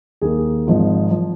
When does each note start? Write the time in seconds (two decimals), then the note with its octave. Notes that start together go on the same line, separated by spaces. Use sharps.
0.21 D#2 D#3 G#4
0.67 G#1 G#2 F3
1.11 F3